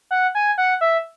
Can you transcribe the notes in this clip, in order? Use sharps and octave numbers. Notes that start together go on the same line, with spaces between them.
F#5
G#5
F#5
E5